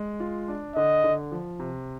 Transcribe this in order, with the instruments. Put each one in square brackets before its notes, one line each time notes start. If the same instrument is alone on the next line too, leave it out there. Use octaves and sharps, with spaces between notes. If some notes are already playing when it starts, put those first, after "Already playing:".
Already playing: [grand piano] G#3
F4
D4
[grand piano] D3 [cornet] D#5
[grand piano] D3
F3
C3